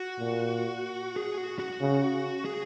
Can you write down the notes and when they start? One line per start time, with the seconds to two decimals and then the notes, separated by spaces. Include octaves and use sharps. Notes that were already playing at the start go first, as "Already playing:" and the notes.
Already playing: F#4
0.19 A#2
1.16 G#4
1.38 F#4
1.59 F#4
1.81 C#3
2.45 G#4